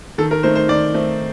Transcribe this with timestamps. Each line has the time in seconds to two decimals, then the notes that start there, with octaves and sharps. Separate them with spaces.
0.18 D#3 A4
0.31 A#4
0.43 A3 C4 D#4 C5
0.55 C5
0.68 D#3 D5
0.94 A3 C4 D#4